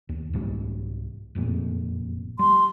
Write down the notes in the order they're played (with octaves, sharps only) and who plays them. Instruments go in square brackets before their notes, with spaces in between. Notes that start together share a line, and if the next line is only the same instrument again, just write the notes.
[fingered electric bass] D#2
C2 G#2 G3
F#1 F2 A#2
[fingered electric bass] G3 [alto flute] C6